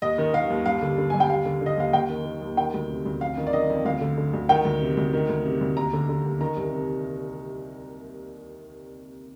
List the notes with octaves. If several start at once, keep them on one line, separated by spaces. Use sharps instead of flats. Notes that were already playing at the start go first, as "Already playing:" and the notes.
D#2 D#5
D#3
D#3 F5
D#2
G2 F5
D3
D3
G2 G#5
G5
D#2 F5
D3
D3 D#5
D#2 F5
D#2 G5
D#3
D#3
D#2
D#3 G5
D2
C3
D2
F2 F5
D#3
D5
D#3 D#5
F2
D2 F5
D3
D3
D2
D#3 G5
D2
C3
D2
D#3
D2
C3
D2
D#2 A#5
D3
D3
D#2
D#3 A#5
C2
C3